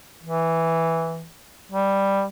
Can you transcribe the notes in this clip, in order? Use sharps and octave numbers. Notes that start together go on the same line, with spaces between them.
E3
G3